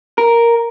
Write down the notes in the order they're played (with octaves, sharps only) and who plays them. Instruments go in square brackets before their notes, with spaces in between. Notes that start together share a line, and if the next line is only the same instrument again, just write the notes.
[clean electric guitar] A#4